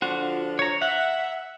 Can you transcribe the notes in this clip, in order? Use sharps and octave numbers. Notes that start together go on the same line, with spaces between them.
D3 F3 D4 F4 F#4
C#5 A#5
E5 F#5